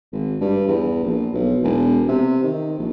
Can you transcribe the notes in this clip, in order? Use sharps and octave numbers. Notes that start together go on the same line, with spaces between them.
G#1
G2
E2
A#1
B1
E1
C3
D#3
A#1